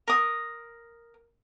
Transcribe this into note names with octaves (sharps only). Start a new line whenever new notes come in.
A#4 D#6